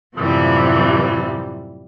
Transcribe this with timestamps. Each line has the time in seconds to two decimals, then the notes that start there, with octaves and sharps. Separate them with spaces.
0.16 F#2 A2 C3 E3 F3 G3